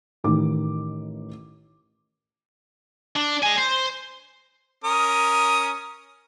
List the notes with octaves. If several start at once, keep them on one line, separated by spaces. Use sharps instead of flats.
A1 D#3 D6
D4
D#5 G#5
C5
C#4 A#4 D#6